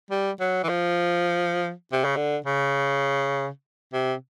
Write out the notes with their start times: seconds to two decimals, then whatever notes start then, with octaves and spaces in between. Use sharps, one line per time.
0.10 G3
0.40 F#3
0.63 E3
0.69 F3
1.92 C3
2.04 C#3
2.16 D3
2.46 C#3
3.93 C3